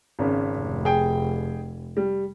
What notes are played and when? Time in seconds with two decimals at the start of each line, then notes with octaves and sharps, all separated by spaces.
0.19 G#1 C#3
0.56 F1
0.85 G#4 G5
1.97 G3